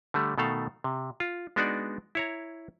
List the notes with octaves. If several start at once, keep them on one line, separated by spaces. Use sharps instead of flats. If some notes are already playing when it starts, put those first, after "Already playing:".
D3 G3 A3
B2 D#3 A3 A4 F5
C3
F4
G#3 B3 D4 D#4 F#4 D5
E4 C#5 A#5